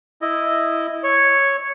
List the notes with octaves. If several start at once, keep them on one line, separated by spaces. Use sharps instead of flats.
E4 D#5
C#5